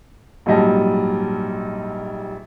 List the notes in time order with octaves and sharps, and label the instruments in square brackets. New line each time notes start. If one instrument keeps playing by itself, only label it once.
[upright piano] A#1 G#2 F#3 G3 D#5 A5